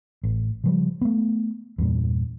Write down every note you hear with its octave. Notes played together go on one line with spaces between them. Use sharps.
A1
C#3 F3 G3
A3 B3
E2 G2 A#2